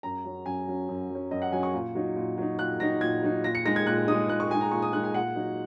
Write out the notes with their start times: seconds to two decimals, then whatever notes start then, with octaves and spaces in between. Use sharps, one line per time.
0.03 F#2 A#5
0.25 F#3 C#4
0.46 F#2 G#5
0.67 F#3 C#4
0.89 F#2
1.10 F#3 C#4
1.31 F#2 D#5
1.42 F#5
1.52 F#3 C#4 G#5
1.63 C#6
1.74 A#2
1.95 F#3 D#4
2.16 A#2
2.37 F#3 D#4
2.59 A#2 F#6
2.80 F#3 D#4 A#6
3.01 A#2 G#6
3.23 F#3 D#4
3.44 A#2 A#6
3.55 C#7
3.65 G#3 D#4 A#6
3.76 G#6
3.86 A#2 F#6
4.08 G#3 D#4 D#6
4.29 A#2 F#6
4.40 C#6
4.51 G#3 G#5
4.54 D#4
4.61 A#5
4.71 A#2 C#6
4.82 D#6
4.93 G#3 D#4 F#6
5.04 G#5
5.14 A#2 F#5
5.36 F#3 D#4